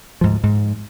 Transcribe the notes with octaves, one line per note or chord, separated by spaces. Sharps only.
D2 G#2 F3
G#2